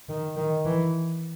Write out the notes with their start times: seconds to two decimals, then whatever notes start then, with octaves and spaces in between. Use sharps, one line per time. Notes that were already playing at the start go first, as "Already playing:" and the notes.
0.09 D#3
0.36 D#3
0.65 E3